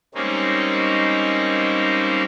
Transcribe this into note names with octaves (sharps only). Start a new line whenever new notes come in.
G3 G#3 A#3 C4 C#4 D#4